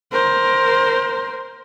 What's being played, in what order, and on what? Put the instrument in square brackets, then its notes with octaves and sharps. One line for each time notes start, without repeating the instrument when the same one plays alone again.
[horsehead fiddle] A#4 C5